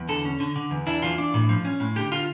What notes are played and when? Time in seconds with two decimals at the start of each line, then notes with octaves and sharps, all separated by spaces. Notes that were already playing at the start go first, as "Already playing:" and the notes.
Already playing: E2
0.09 D3 A4
0.25 C#4
0.40 D3
0.56 D3
0.71 E2
0.87 D4 E4
1.02 E3 F4
1.18 D4
1.34 A2
1.49 F3
1.65 C#4
1.80 A2
1.96 D3 G4
2.12 D3 F4